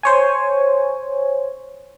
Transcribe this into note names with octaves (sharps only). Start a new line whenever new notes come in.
C5 C#5 G#5